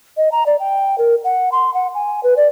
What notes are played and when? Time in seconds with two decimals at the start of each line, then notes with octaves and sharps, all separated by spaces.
0.17 D#5
0.32 A#5
0.46 D5
0.60 G5
0.98 A#4
1.24 F#5
1.52 C6
1.74 F#5
1.95 G#5
2.23 B4
2.37 D5